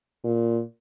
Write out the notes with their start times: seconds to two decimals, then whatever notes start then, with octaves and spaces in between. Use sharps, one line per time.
0.24 A#2